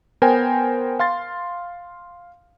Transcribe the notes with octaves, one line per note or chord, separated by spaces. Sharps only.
B3 A#4 C5 G5 G#5
F5 C6 A6